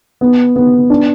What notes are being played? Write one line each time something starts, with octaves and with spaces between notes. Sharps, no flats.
B3
B3
D4